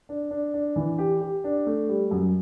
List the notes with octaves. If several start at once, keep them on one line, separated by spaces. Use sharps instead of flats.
D4
D4
D4
E3
G4
G4
D4
A3
G3
F#2